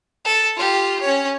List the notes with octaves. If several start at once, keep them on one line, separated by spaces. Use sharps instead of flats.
A4
F4 G4
C#4 C#5